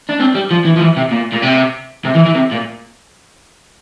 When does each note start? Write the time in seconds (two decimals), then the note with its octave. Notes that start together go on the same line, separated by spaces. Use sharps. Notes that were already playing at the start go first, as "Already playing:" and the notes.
0.09 D4
0.20 C4
0.35 G3
0.51 F3
0.65 E3
0.76 F3
0.80 E3
0.97 C3
1.11 A#2
1.33 A#2
1.43 C3
2.05 C3
2.15 E3
2.25 E3
2.35 C3
2.51 A#2